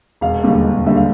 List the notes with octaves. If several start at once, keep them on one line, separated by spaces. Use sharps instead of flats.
E1 F5
D#2 D3 G3
E1
D#2 D3 G3 E5
F5